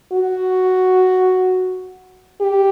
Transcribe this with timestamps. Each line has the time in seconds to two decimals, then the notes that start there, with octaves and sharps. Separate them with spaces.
0.12 F#4
2.41 G4